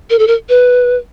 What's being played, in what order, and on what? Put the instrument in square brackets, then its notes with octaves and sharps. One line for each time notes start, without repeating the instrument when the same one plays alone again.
[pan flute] A#4
A4
A#4
B4